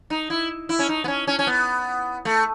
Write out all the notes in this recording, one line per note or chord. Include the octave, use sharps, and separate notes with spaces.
D#4
E4
E4
C#4
D#4
B3
C#4
C#4
C#4
B3
A3